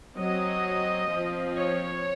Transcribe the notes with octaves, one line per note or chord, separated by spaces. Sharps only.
F#3 C4 D#5
F3 C4
C#5